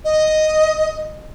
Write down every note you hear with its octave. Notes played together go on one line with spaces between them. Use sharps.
D#5